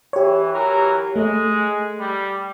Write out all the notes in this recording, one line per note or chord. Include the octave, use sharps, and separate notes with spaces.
E3 G4 C#5
E3 F#3 A#4
G#3 A3
G3